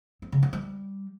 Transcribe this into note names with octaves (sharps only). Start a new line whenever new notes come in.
C4
C#3
E3
G3